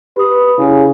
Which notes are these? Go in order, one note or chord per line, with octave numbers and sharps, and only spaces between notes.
G4 B4 D#6
C#3 E4